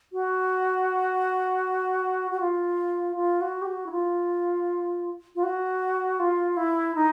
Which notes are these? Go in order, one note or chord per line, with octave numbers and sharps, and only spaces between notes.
F#4
F#4
F4
F4
F#4
G4
F#4
E4
F4
F4
F#4
F4
E4
D#4